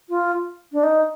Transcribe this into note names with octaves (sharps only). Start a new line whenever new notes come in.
F4
D4
D#4